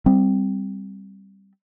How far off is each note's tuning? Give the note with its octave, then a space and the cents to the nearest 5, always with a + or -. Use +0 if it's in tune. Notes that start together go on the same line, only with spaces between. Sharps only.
G3 +0 C4 +0